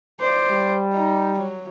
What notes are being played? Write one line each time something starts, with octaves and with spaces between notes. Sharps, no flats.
C5 D5
G3
D#4
F#3